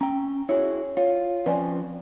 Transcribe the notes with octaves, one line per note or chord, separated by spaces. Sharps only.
C#4 G5 A#5
E4 F#4 G#4 C#5
F4 C#5
F3 C4 C#4 B4 D5 G#5